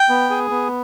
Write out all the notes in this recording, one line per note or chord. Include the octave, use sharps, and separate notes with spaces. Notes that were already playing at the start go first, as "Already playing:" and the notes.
Already playing: G5
B3
G#4
B3